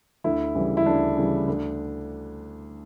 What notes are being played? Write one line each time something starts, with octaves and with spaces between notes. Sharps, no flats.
D2 E4
C#3 E3 G3
E4
D2 D4
C#3 E3 G3
D2